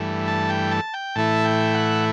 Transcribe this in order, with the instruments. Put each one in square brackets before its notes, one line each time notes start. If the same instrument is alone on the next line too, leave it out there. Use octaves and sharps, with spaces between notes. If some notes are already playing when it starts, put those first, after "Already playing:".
Already playing: [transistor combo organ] G2 E3 A3
A5
G5
A5
G5
A2 E3 A3 E4 A5
G5
F#5